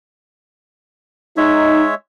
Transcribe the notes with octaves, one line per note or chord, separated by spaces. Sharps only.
G#3 D#4 C#5 E5